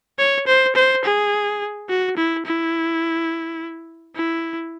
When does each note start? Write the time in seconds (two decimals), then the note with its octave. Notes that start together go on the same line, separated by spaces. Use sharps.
0.18 C#5
0.47 C5
0.75 C5
1.04 G#4
1.89 F#4
2.17 E4
2.45 E4
4.15 E4